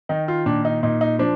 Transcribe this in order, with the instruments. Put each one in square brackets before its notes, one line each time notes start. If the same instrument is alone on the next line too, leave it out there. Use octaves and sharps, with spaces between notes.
[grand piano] D#3 D#4
F4
A#2 D4
D#4
A#2 D#4
D#4
F3 D4